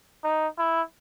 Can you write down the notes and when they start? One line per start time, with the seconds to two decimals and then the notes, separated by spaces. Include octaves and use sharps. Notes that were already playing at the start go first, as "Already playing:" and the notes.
0.24 D#4
0.58 E4